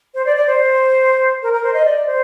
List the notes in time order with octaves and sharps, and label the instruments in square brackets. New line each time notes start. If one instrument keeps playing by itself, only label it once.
[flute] C5
D5
D5
C5
A#4
A#4
C5
D#5
D5
C5